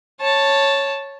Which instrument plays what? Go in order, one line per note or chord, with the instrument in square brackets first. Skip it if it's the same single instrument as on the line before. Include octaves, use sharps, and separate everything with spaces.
[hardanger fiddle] C#5 A5